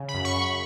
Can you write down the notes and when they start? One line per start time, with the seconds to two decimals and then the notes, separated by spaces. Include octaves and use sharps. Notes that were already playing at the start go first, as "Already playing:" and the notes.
Already playing: C#3
0.08 B5
0.14 F#2
0.25 C#6
0.36 F#2
0.41 B5